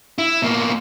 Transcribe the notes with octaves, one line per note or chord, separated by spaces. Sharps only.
E4
B2 A#3